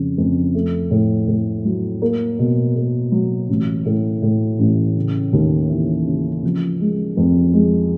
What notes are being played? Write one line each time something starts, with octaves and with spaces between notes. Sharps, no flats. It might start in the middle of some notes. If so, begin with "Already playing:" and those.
Already playing: F2 C#3
F2
A3
A2
A2
F#3
A#3
B2
A#3
F#3
A1
A2
A2
A1
C#3
D#2
E3
C#3
F3
G#3
F2
G#3